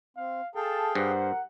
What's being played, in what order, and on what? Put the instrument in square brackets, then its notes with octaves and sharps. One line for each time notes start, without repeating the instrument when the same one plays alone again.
[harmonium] C4 [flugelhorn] F5
[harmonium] G#4 F5 G5 [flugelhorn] A4 [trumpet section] A5
[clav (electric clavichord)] G2 [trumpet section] A#4 F#5 [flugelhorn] C5